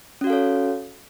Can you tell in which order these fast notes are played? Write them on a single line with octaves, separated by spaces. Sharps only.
C#4 F#4 F5 A4 C#5